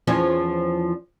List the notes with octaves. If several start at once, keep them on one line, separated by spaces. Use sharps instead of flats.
E2 F3 C#4